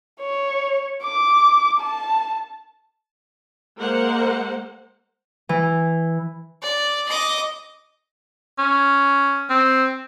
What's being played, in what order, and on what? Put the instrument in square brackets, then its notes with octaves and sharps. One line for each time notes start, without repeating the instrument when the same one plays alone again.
[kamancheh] C#5
D6
A5
[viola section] G#3 A#3 A#4 C5 F#5
[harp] E3
[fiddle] D5
D#5 D6
[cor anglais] C#4
C4